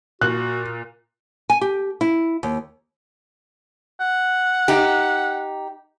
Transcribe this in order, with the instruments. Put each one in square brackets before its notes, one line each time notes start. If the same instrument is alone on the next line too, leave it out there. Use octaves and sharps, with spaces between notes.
[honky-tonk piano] A#2 [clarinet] F#4 [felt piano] F#6
[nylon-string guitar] G#5
G4
E4
D#2
[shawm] F#5
[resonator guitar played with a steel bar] D#4 G4